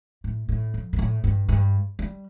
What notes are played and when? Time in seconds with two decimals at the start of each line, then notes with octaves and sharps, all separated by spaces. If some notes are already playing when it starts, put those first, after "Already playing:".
0.24 A2
0.49 A2
0.74 F2
0.93 A#2
0.99 A2
1.24 G2
1.49 G2
1.99 G3